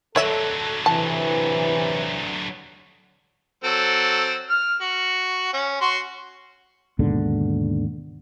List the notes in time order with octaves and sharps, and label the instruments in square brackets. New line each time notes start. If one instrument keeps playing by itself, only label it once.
[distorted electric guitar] D3 F#3 [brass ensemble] A4 [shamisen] C#5 E5
[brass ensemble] C3 E3 [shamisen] A5
[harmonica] F#3 C4 A4
F6
F#4
C#4
F#4 C6
[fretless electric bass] D#2 G#2 B2 D3